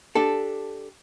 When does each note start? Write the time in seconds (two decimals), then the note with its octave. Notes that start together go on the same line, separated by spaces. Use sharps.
0.15 D4 G4 A4